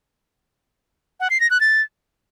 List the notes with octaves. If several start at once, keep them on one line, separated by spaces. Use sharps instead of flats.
F#5
C7
A#6
F#6
A6